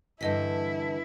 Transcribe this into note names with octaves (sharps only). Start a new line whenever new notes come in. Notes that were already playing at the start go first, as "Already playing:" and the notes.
G2 D3 E3 E4 D#5 B6